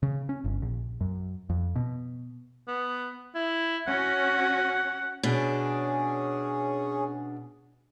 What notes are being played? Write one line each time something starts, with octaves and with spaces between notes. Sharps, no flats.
C#3
C#4
G1
A#1
F#2
F2
B2
B3
E4
C#4 F#4 F#5
B2 C#4 D4 G#4